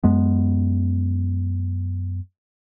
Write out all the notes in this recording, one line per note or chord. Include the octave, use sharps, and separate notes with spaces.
F#2 G#3 B3